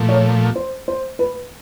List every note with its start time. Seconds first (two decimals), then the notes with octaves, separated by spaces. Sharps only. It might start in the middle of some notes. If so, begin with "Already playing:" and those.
Already playing: A#2 F3 A3
0.09 C#5
0.56 C5
0.88 C5
1.19 B4